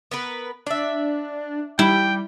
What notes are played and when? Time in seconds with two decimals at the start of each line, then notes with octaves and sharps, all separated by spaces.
0.11 B3 A#4 B4
0.67 D4 D5 E5
1.79 G3 E4 G5